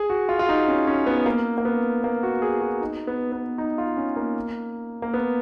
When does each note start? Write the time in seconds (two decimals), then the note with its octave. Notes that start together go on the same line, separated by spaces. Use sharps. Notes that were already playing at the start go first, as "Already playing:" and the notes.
Already playing: G#4
0.10 F#4
0.29 F4
0.39 F4
0.49 D#4
0.68 C#4
0.87 C#4
1.07 B3
1.26 A#3
1.58 A#3
1.65 B3
2.04 A#3
2.23 F#4
2.42 G#4
2.61 F#4
2.81 D#4
3.07 B3
3.32 B3
3.58 D#4
3.78 F4
3.97 C#4
4.16 A#3
5.02 A#3
5.14 B3